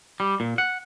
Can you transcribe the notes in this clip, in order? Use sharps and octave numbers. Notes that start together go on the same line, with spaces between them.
G3
A#2
F#5